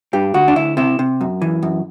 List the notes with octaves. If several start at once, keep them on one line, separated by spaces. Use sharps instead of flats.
G2 G4
D2 F#4
D4
D2 E4
C3 E4
C3
F#2
E3
F#2